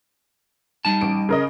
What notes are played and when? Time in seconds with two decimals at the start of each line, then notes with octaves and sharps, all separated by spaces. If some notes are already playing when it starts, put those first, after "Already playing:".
0.85 G3 D#4 A5
1.01 A1 D7
1.29 C#3 A#4 D#5